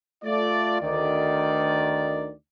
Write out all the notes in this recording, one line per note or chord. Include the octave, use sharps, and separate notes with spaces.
A3 F4 D5
D2 D#3 D5